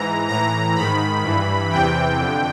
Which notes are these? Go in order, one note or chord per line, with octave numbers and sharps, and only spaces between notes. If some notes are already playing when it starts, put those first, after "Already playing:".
Already playing: G#2 E3 A#5
A2 E3 A#5
G#2 D#3 B5
G2 E3
E2 C3 E3 G5
F2 D3